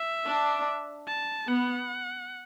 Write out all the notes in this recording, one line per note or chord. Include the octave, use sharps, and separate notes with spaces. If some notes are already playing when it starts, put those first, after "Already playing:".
Already playing: E5
D4
A5
B3 F#5